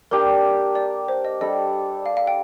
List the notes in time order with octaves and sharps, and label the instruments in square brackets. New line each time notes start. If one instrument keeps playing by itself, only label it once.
[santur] A#3 D4 G4 [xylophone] A#4
[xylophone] D5
C5
D#5
[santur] G3 D4 A4 [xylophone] D#5
[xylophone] F5
F5
G5